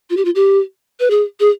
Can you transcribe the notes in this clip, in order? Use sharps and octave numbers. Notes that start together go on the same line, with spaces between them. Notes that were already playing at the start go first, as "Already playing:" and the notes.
F4
G4
F4
G4
B4
G#4
G#4